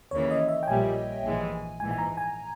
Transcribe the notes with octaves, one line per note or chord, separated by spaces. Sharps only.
D#2 C#3 E3 A#3 C#5
D#5
E5
G5
A#1 A#2 G3 G#5
A#1 G#2 E3 G#3
A#1 G#2 E3 G#5
G#5
A#5
G#5